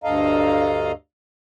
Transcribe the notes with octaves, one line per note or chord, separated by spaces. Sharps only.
D2 G2 A4 D#5 F5 A#5